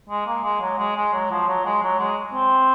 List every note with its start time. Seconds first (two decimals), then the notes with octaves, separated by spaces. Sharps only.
0.10 G#3
0.26 A#3
0.44 G#3
0.61 F#3
0.78 G#3
0.96 G#3
1.13 F#3
1.31 F3
1.48 F#3
1.65 G#3
1.83 F#3
1.99 G#3
2.34 C4